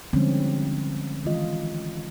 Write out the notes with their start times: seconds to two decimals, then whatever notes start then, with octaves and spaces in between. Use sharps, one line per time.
0.13 D3 F3 G3 G#3 C4 C#4
1.25 D#3 E3 G#3 F4 D#5